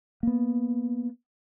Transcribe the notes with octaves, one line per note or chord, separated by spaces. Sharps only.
A#3 B3